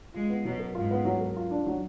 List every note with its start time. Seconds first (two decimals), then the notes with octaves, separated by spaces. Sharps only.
0.14 G#3 F4
0.30 B3
0.45 B2 F#3
0.59 A#4
0.75 G#2 F4
0.91 B3
1.05 F#3
1.21 A#4
1.37 F4
1.51 D4
1.66 F#3